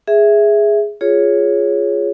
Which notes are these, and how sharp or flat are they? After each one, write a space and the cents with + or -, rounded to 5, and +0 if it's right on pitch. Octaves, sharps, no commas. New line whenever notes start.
G#4 +0 E5 +0
F4 +0 G#4 +0 C#5 +0